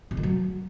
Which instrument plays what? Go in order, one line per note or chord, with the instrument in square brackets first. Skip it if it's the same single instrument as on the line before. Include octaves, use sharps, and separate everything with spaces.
[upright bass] C3
D#3
F#3